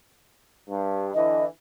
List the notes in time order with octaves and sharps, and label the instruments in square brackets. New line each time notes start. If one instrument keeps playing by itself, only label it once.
[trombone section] G2
[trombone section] D3 E3 [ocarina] D#5